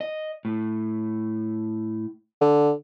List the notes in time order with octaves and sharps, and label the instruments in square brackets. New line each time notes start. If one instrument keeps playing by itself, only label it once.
[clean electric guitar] D#5
A2
[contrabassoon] D3